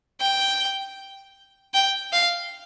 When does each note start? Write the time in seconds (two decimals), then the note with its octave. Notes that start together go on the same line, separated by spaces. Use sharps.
0.20 G5
1.74 G5
2.13 F5